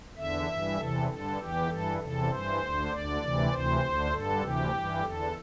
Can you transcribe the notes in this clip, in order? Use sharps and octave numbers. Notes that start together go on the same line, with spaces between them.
E2 D3 E5
G2 E3
E2 C3 E3 A4
G2 D3 A4
E2 E3 G4
G2 E3 A4
E2 C3 E3 A4
G2 E3 C5
D2 D3
D2 D3 D5
D2 C3 E3
D2 C3 E3 C5
D2 D3
G2 D3 A4
D2 C3 E3 G4
G2 E3
E2 D3 A4